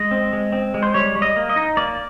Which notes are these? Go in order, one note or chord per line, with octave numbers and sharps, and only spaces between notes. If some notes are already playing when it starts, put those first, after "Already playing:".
Already playing: G#3 D#5
C4
G#3
C4
G#3
C5
G3 C#5
G3
D#5
A#3
D#5
D#4
A#3 D5